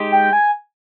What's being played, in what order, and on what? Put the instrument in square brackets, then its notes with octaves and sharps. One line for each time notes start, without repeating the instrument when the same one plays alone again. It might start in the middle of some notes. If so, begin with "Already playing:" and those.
Already playing: [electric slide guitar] G#3 D#4 G4
[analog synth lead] G5
G#5